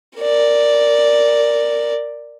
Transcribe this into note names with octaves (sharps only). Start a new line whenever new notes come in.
A#4 D5